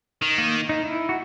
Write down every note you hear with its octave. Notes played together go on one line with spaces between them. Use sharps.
D#3
A#3
D#4
E4
F#4